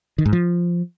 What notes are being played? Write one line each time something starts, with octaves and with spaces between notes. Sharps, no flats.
D#3
G#2
F3